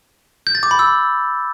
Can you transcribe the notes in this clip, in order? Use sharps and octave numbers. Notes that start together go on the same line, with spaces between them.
G6
A6
D6
B5
E6